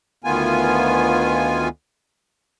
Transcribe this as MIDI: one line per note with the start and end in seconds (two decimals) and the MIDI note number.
0.24 1.68 38
0.24 1.68 51
0.24 1.68 59
0.24 1.68 65
0.24 1.68 80